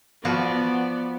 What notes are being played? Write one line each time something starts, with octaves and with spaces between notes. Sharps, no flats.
F3 B3 F#4 D5